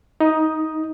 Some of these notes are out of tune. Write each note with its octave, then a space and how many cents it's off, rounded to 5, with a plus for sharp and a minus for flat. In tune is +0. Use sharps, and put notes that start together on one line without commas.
D#4 +15 D#6 +0